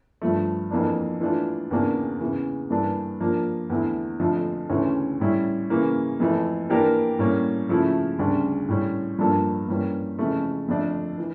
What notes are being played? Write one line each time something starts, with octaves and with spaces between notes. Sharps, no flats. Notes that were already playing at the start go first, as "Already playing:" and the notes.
G2 F3 A3
F2 E3 A#3 D4
E3 A3 D4 F4
E2 C#3 E3 A#3 D4
E2 C#3 E3
G2 E3 A#3 D4 A4
F3 A#3 D4
E2 D3 A3 E4
F2 D3 F3 A3
D2 C#3 E3 A3 C#4
A2 G3 C#4 E4
C#3 E3 A#3
F2 E3 A3
E3 A#3 D4 G4 A#4
A2 G3 A#3 C#4
C#3 F3 A3 E4
D2 C#3 G3 D4
A2 G3 C#4
G2 F3 A#3 D4 A4
G2 E3 G3 A#3 C#4
F2 C#3 E3 A3
F2 D3 A3 D4
E3